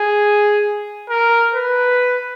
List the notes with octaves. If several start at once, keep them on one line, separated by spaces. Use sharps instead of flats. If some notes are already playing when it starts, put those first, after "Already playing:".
Already playing: G#4
A#4
B4